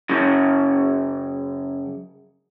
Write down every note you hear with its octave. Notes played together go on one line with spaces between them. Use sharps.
F#2 C#3